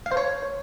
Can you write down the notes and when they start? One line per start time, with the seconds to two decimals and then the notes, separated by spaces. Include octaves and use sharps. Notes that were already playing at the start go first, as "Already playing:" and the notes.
0.06 F5
0.12 C5
0.17 C#5